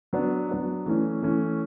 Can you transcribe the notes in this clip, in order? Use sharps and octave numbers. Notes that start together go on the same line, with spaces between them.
F#3 B3 D4
F#3 B3 D4
E3 A3 C#4
E3 A3 C#4